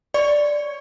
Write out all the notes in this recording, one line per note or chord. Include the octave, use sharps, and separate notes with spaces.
C#5 D5